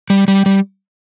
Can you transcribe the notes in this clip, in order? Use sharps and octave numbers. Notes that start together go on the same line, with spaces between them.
G3
G3
G3